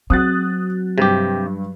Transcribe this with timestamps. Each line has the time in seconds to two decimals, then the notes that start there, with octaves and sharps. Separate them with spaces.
0.10 F#3 C4 F#4 D#6 F#6 A6
0.98 G2 C3 G4